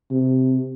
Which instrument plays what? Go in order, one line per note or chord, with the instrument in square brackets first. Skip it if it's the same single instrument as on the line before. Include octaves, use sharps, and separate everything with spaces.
[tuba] C3